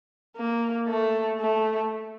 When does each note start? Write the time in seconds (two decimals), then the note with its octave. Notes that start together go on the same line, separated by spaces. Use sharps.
0.37 A#3
0.89 A3
1.40 A3